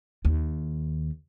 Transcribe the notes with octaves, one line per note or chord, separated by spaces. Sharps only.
D#2